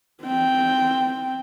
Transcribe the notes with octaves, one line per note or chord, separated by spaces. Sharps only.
C4 G5